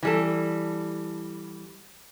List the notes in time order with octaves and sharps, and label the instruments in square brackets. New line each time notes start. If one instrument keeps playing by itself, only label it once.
[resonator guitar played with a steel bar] E3 G3 A4